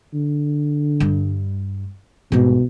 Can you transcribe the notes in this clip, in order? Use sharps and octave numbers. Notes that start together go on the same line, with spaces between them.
D3
G2 G3
C2 G#2 B2